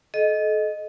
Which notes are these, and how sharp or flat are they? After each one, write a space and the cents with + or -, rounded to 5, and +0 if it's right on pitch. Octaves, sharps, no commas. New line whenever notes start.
A4 -35 D#5 +0